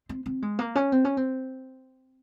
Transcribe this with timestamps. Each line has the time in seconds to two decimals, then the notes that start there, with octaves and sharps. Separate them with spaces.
0.09 C4
0.26 C4
0.42 G#3
0.59 A#3
0.75 C#4
0.92 C4
1.05 C#4
1.17 C4